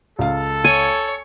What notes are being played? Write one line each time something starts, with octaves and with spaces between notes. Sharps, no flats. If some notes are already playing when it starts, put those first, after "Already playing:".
C#2 A4 F5
C#5 G#5 C#6